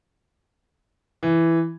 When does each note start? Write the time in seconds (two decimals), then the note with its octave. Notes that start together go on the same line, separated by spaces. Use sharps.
1.23 E3